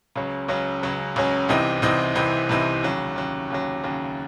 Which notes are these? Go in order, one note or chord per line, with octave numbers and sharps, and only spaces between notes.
C#2 C#3 F#3 C#4
C#2 C#3 F#3 C#4
C#2 C#3 F#3 C#4
C#2 C#3 F#3 C#4
C2 C3 E3 C4 D#4
C2 C3 E3 C4 D#4
C2 C3 E3 C4 D#4
C2 C3 E3 C4 D#4
D#2 C#3 F#3
D#2 C#3 F#3
D#2 C#3 F#3
D#2 C#3 F#3